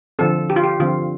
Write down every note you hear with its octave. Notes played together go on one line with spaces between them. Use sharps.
D3 F3 C4 A4
G4
F4
G4
D3 F3 C4 F4